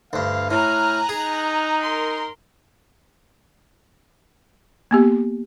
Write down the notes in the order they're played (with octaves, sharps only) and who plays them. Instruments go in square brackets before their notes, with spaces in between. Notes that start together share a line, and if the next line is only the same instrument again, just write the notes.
[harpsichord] D2 G2 [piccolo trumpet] F5
[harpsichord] A2 [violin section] G#5 A#5 F#6 [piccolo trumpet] F6
[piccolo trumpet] D#4 [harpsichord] G#4
[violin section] A#4 C6
[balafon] A#3 B3 G4